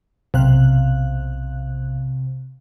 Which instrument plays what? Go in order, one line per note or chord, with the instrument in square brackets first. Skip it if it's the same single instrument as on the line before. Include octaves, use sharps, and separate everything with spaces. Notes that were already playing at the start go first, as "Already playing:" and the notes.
[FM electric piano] B1 F5 F#6 [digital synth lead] C3